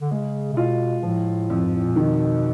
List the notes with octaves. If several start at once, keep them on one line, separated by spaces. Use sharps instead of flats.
D3
C#3 G#3
C3
B2 F4
A2 F3
F2
G#2
A2
A#2
B2 D#3